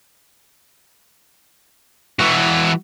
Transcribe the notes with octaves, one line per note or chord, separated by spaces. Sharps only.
E3 F#4